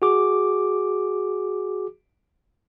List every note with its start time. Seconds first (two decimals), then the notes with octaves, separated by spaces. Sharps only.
0.02 F#4 G#4 D6